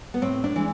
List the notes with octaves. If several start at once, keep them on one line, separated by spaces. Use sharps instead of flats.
B3
A2 C4
D4
E3 G#3